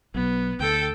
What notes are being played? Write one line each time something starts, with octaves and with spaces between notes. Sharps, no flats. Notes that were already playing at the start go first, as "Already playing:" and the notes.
B1 B3
D2 A4 G5